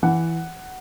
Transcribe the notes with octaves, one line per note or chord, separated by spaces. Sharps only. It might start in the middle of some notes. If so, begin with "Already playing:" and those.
E3 F#5